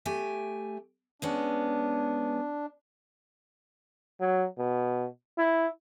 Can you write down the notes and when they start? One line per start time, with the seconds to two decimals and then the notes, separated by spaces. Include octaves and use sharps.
0.06 A3 G4 G#5
1.22 G#3 B3 C#4 D4
4.20 F#3
4.58 B2
5.38 E4